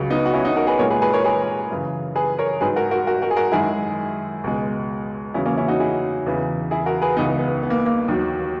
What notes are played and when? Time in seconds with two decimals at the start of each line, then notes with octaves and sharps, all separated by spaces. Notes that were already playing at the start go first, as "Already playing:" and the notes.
Already playing: C#2 C#3 F#3
0.10 B3 D#4
0.26 F#4
0.33 C#4 E4
0.44 D#4 F#4
0.56 F#4 A#4
0.67 G#4 B4
0.79 A#2 A#4 C#5
0.82 G#3
0.90 G#4 B4
1.02 G#4 B4
1.13 A#4 C#5
1.24 G#4 B4
1.70 F#2 C#3 E3
2.15 G#4 B4
2.38 A#4 C#5
2.61 G#2 F#3 G#4 B4
2.76 F#4 A#4
2.91 F#4 A#4
3.07 F#4 A#4
3.22 F#4 A#4
3.31 G#4
3.36 F#4 A#4
3.52 F#2 D#3 G#3 E4 G#4
4.44 C#2 B2 G#3
5.34 E2 C#3 F#3 C#4 E4
5.46 A#3 C#4
5.57 C#4 E4
5.68 D#4 F#4
5.80 E4 G#4
6.26 E2 C#3 E3
6.71 E4 G#4
6.86 F#4 A#4
7.02 G#4 B4
7.17 C#2 C#3 E3 B3 D#4
7.39 B3
7.63 B3
7.70 A#3
7.86 A#3
8.08 D#2 D#3 F#3